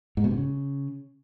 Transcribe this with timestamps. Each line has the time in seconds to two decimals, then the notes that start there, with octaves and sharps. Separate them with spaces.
0.17 G#2
0.24 B2
0.31 C3
0.37 C#3